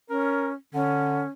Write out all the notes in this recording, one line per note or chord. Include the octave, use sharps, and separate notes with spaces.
C#4 A#4
D3 C#4